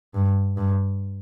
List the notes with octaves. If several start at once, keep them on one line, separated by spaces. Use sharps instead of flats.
G2
G2